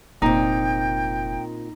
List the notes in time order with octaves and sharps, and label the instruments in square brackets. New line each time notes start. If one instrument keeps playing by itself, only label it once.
[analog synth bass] F1 [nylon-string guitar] A#2 C4 [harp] D#4 [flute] G5